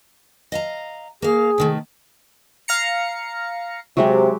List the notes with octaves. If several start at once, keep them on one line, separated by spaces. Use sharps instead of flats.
D#5 F5 A#5
A#3 G#4 F5
C3 D#3 A3
F5 A#5 C#7
C3 F#3 G#3 G4